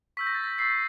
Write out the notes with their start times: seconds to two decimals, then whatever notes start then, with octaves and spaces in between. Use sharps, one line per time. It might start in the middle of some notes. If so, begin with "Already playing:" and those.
0.17 C#6 E6 G6 B6
0.27 A#6
0.35 A6
0.44 A#6
0.58 C#6 E6 G6 C7